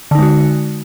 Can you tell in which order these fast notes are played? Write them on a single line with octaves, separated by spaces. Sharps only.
D3 D#4 G#3 F#4